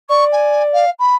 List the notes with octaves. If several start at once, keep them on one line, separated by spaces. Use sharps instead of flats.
D5 C#6
G#5
F5
B5